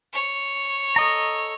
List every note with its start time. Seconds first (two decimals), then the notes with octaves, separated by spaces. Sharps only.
0.14 C#5
0.96 A4 D#5 A#5